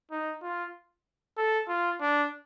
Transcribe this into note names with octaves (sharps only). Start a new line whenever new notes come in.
D#4
F4
A4
F4
D4